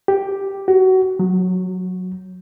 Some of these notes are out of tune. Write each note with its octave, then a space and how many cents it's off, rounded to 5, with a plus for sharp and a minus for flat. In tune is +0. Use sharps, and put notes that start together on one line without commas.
G4 +0
F#4 +25
F#3 -15